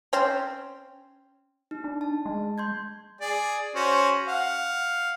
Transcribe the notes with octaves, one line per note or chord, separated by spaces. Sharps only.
C4 C#4
D#4
D4
A5
G#3
C6 G6 G#6
G#4 D5
C#4 F#4 C5
F5 F#5